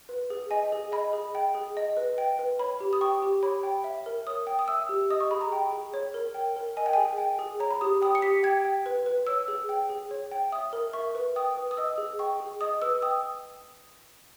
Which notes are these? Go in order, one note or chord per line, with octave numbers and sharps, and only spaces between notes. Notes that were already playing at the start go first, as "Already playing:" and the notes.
B4
G#4
D#5 G#5
G#4
D#5 B5
G#4
G5
G#4
D#5
B4
G5
B4
C#5 B5
G4
D#6
G5 C#6
G4
C#5 B5
G5
E5
A#4
C#5 D#6
G5
D#6
E5 E6
G4
D#5 D#6
C#6
G#4 B5
A#5
G5
G#4
C#5
A#4
G5
A#4
D#5 G#5
G5
G#4 G#5
G5
G#4
C#5 A#5
B5
G4 D#6
G5 D#6
C#7
G4 B6
G5 G#6
G5
B4
B4
C#5 E6
G#4
G5
G#4
C#5
G5
E5 D#6
A#4
E5 C#6
B4
G5 D#6
B4
D#6
D#5 E6
G#4
G5 C#6
G#4
D#5 D#6
B4 E6
G5 D#6